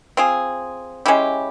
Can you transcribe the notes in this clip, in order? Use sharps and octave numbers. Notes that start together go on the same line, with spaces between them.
C4 F4 G#4
G#3 C#4 E4 G4